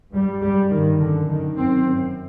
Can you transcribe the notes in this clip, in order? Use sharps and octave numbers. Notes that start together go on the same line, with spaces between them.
G2 G3
F#2 G3
G2 D#3
F#2 D3
F#2 D#3
F#2 C4
F#2